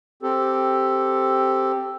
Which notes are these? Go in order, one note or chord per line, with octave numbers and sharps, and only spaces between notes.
C4 G4 A4